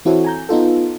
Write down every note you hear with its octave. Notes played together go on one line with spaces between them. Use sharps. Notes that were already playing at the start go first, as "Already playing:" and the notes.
E3 C4 E4 F#4 A4 C#5
G#5 A#5 G6
B3 D#4 F4 A4